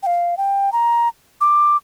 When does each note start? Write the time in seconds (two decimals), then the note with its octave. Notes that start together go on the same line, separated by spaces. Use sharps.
0.03 G5
0.06 F5
0.37 G5
0.72 A#5
1.41 D6